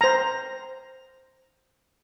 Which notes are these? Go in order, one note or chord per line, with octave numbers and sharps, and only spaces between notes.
C5 A#5